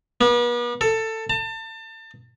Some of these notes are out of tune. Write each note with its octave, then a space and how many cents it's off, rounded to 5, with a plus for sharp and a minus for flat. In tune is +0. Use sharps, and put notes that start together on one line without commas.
B3 -40
A4 +15
A5 +30